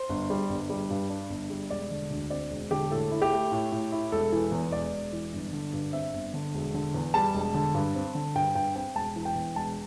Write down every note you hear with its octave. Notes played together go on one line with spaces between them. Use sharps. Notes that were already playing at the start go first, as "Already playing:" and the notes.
Already playing: C5
G1
G3
G1
G3
G2
D4
G1
G3
E1 D5
D3
D2
C4 D5
E1
D3 G4
A2 A4
E4
G4
A3
A2
A2
E4
E1 A4
E3
E2
E1 D5
E1
E3
G1
D3
G2
C4 E5
G1
D3
E1
D3
E2
G3 A5
E1
D3
G2
C4
D3
G2 G5
G2 G5
C4 G5
E1 A5
E3
G5
E2
E1 A5